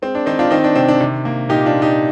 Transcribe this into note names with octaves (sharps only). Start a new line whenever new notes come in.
G#3 C4
D4
D#3 C4 D#4
D4 F4
D#3 C4 D#4
D4
C3 C4
D4
C3
A#3
A#2 D#4 G4
D4 F4
A#2
D#4 G4